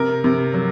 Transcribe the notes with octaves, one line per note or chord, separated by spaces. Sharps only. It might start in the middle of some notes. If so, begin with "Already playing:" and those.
Already playing: C3 A#4
C3
F#3